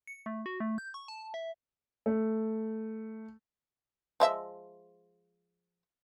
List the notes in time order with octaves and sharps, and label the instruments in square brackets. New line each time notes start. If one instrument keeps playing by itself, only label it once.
[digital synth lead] C#7
A3
F#4
A3
G6
C#6
A5
E5
[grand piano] A3
[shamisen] F3 G#3 E5